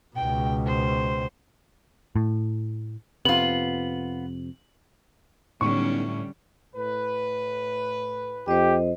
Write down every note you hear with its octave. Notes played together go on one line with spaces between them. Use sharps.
C#2 B2 G5
C5
A2
F2 C3 B3 F4 F#7
B1 A2 D3 G3 C#4 C#6
A2 B4
F2 G4 C5 D#5